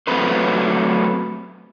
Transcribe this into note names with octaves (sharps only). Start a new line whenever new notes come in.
F#3 A3 C4 B4 C5